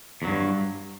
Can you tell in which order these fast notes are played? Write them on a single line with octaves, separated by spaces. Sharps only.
E2 F#3 G2